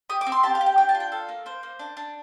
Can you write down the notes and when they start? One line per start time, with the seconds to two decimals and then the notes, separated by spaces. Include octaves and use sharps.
0.10 G4 D#6
0.21 D6
0.26 C4
0.32 C6
0.43 G4 A5
0.55 F5
0.61 G4
0.66 G5
0.78 D4 G5
0.89 A5
0.95 F4
1.00 G5
1.12 A4 F5
1.29 A#3
1.46 A#3 C5
1.63 A#3
1.79 D4
1.97 D4